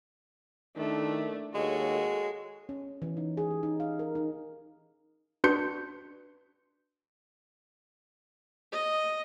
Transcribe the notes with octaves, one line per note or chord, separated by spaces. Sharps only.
D#3 A3 D4 E4
D#2 G#3 F#4 A4 C#5
C#4
E3
D#4
G#4
G4
D#4
F5
A#4
D#4
D4 F#4 B4 C6 G6 C#7
D#5